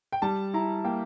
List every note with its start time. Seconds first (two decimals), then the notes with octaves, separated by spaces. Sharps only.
0.12 G5
0.22 G3 A5
0.54 E4 A#5
0.85 A#3 G5